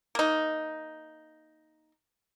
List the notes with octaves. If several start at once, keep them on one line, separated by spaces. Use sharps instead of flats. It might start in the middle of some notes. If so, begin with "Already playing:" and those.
A#3 D#4